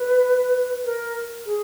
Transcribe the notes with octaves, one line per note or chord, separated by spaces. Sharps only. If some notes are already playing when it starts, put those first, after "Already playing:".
Already playing: B4
A#4
G#4